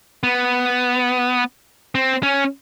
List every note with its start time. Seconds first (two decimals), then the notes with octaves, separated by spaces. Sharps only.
0.23 B3
1.95 C4
2.23 C#4